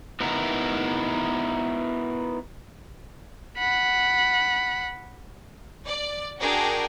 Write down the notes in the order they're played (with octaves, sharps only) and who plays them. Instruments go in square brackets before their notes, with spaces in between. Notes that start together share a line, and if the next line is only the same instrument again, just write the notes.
[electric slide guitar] B3 D#4 E4 F#4 A#4
[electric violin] F#5 B5
[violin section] D5
D4 F#4 G#4 A#4 G5